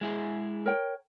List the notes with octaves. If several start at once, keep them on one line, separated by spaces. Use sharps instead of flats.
G#3 E4 G#4
A#4 C#5 G5